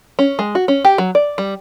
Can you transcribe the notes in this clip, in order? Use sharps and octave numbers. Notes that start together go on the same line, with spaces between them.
C#4
G#3
F#4
C#4
G4
F#3
D5
G3